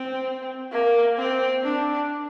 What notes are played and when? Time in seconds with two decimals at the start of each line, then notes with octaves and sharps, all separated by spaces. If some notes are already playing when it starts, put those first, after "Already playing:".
Already playing: C4
0.72 A#3
1.17 C4
1.64 D4